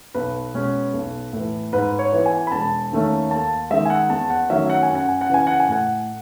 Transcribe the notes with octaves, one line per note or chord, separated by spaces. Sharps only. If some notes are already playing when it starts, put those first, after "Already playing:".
B1 B4
B2 G#3 C#4
B1
A2 E3
G#2 B4
C#5
E3 B3
G#5
B5
E1 A5
D#2 D#3 A3 C#4
D#2 A5
D#3 G#3 E5
G#5
F#5
E2 A5
F#5
D#3 F#3 A3 C#4 E5
F#5
G#5
F#2
F#5
G#5
F#5
C#3 E3 G#5
F#5
G#5
A2 F#5